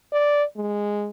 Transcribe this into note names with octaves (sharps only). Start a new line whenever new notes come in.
D5
G#3